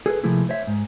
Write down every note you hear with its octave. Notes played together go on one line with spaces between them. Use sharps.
G#4 A4 B4
C3 F3 A3 A#3 E4 G#4
C5 C#5 E5
G#2